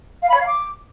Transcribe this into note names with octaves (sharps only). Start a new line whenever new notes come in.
F5
B5
C#5
F5
D6